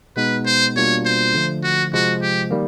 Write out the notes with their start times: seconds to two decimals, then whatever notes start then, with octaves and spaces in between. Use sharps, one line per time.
0.17 B2 G#3 B3 D#4 B4
0.46 C5
0.76 B2 G3 A#3 D4 F4 C#5
1.06 C5
1.34 D3 F3 A3
1.63 F#4
1.93 C3 F3 G#3 F#4
2.22 G4
2.51 D#3 G3 A#3